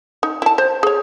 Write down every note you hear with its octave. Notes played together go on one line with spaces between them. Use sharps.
D#4
E4 A5
C5
G#4 C#5